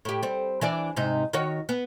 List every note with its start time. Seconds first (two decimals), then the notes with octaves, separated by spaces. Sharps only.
0.05 A2 G4
0.23 G3 C4
0.61 E3 D4 D5
0.96 G#2 C3 D#4
1.33 D#3 F#4 C#5
1.69 B3